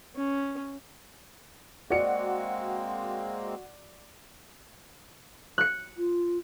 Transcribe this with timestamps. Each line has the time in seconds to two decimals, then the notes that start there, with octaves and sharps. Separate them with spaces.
0.15 C#4
1.90 G#3 A#3 C4 F#4 D5 C#7
5.58 F#6 C#7
5.98 F4